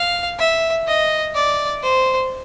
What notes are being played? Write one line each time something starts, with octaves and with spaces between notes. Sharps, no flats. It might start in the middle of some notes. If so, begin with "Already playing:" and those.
Already playing: F5
E5
D#5
D5
C5